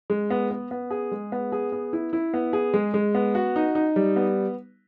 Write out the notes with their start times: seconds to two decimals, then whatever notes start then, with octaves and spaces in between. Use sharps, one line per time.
0.10 G#3
0.30 B3
0.51 B3
0.71 B3
0.90 G#4
1.11 G#3
1.32 B3
1.52 G#4
1.72 B3
1.93 E4
2.13 E4
2.34 B3
2.53 G#4
2.74 G#3
2.94 G#3
3.15 B3
3.35 F#4
3.56 D#4
3.75 D#4
3.96 G3
4.16 B3